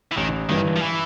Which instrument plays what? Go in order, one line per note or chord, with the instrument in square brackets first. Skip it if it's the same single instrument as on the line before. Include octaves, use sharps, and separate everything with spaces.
[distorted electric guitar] E3
[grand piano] A1 [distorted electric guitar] D#3
[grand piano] G2 E3 [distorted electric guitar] D#3
[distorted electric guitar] F3
E3